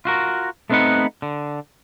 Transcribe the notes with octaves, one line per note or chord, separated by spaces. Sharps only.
F4 F#4 A#4
A3 B3 C4 D#4 B4 F#5
D3